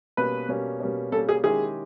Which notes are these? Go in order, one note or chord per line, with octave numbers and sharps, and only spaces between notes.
B2 G3 A#3 C#4 B4
B2 G3 A#3 C#4
B2 G3 A#3 C#4
B2 G3 A#3 C#4 A4
G#4
D#3 G#3 C#4 E4 G4 G#4